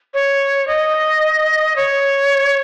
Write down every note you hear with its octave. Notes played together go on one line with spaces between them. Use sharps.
C#5
D#5
C#5